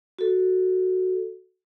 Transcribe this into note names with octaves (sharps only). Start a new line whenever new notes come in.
F#4 A4